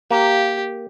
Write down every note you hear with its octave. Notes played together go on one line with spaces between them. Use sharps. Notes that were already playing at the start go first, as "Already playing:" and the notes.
A#3 G4